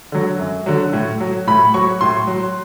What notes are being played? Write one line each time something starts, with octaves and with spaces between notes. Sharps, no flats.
D3 F#3
F#2
D3 F#3
A2
F#3
A2 B5
F#3 C#6
A2 C6
F#3